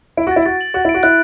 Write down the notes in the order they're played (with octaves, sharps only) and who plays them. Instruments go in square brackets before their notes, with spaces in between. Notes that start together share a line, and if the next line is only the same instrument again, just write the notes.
[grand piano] E4 [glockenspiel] D7
[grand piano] F#4
[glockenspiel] A6
[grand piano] E4
[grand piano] F#4 [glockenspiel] A6
[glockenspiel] F#7
[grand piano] F#4 [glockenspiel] A6
[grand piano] E4
[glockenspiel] D7
[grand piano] F#4
[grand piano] E4 [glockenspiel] F#6